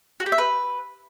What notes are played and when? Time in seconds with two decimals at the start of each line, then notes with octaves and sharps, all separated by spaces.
0.20 F#4
0.26 G4
0.32 E5
0.38 B4